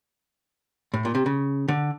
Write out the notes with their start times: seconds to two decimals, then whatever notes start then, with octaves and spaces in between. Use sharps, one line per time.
0.94 A2
1.05 A#2
1.15 C3
1.26 C#3
1.68 D3